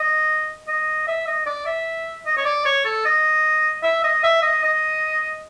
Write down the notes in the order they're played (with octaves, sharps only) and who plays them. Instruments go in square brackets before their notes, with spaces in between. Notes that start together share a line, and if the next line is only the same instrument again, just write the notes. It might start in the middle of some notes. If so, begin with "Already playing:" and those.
Already playing: [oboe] D#5
D#5
E5
D#5
D5
E5
D#5
C#5
D5
C#5
A4
D#5
E5
D#5
E5
D#5
D#5